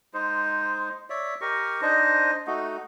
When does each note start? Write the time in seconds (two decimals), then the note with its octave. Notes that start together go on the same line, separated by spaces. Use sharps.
0.14 G#3 D#4 C5
1.10 C#5 D5 E5
1.41 G4 A#4 D#5 C#6
1.82 D4 D#4 C5 D#5
2.47 A3 D#4 F#4